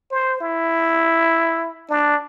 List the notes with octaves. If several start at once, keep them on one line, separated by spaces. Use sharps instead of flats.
C5
E4
D4